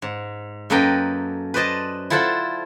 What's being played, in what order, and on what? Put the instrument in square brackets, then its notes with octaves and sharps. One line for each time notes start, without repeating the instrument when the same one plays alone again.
[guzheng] G#2
F#2 A#3 A4 B4 D#5 G5
B4 C5 D5 D#5 A5
E4 F4 A4 C5 F#5 A5